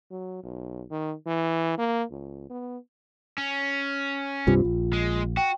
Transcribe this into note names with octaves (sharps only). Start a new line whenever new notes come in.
F#3
B1
D#3
E3
A#3
C#2
B3
C#4
C2 G2 C3 F4
A#1
G#3
F#4 G5